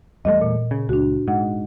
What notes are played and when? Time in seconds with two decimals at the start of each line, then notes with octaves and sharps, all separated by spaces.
0.25 E2 G3 A3 D#5
0.41 A#2
0.71 C#3
0.89 C#2 D4 F#4
1.28 G#2 F#5